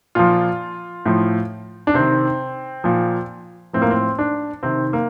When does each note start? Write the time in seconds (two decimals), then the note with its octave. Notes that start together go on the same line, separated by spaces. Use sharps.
0.15 A#2 F3 F4
1.06 A2 F3
1.87 D4
1.94 C3 D#3 C4
2.84 A#2 F3
3.73 A2 F3 C4
3.82 A#3
3.90 C4
4.19 D4
4.63 C3 D#3 C4
4.93 A#3